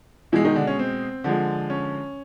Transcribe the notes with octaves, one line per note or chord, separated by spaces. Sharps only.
B2 E3 G#3 E4
D#3 D#4
D3 D4
C#4
C4
D3 F3 G#3
C#4